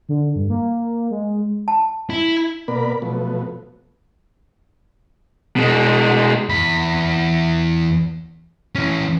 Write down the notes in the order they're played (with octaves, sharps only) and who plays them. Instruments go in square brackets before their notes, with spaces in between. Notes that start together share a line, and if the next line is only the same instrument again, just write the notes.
[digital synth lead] D3
G2
A#3
G#3
[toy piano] A5
[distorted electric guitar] E4
[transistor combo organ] B2 A#3 B3 A#4 D5 B5
B2 F3 F#3 A3 B3
[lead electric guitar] B2 G#3
[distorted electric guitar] E2 B5
E3 C#4